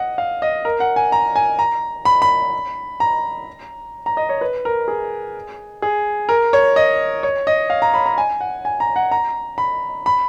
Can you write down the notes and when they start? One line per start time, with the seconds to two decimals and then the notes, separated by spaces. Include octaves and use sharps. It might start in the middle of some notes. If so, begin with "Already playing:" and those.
Already playing: D#5 F#5
0.18 F5
0.42 D#5
0.65 A#4
0.80 F#5
0.96 G#5
1.12 A#5
1.36 G#5
1.59 A#5
2.05 B5
2.22 B5
3.00 A#5
4.06 A#5
4.17 D#5
4.29 C#5
4.41 B4
4.65 A#4
4.88 G#4
5.82 G#4
6.29 A#4
6.53 C#5
6.76 D#5
7.23 C#5
7.47 D#5
7.70 F5
7.82 A#5
7.94 B5
8.06 A#5
8.18 G#5
8.41 F#5
8.65 G#5
8.80 A#5
8.96 F#5
9.11 A#5
9.58 B5
10.06 B5